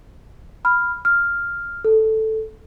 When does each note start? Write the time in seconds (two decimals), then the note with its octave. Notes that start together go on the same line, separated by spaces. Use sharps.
0.65 B5 F6
1.05 F6
1.84 A4